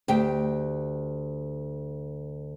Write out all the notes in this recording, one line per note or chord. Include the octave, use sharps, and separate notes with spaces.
D2 G4 G5